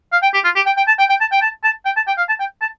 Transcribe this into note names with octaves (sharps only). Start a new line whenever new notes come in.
F5
G5
G4
F4
G4
G5
G5
A5
G5
G5
A5
G5
A5
A5
G5
A5
G5
F5
A5
G5
A5